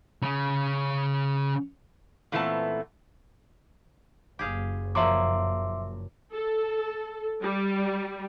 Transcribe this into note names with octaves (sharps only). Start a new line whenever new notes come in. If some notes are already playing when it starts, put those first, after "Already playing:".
C#3 C#4
A#2 E3 A3 B3 C4 A5
F#1 G4 G#4 F5
A#2 F3 F#3 E5 C6 D6
A4
G3